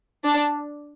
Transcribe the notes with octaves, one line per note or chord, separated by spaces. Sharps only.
D4